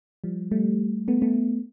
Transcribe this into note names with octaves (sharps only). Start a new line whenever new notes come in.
F3 G3
G3 A3
A3 B3
A3 B3